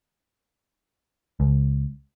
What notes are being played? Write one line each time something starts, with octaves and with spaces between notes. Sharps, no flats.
C#2